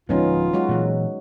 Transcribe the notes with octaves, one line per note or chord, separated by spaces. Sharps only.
D1 F3 G#3 B3 C#4 D#4 F4
F#3 G#3 F#4
A#2 E3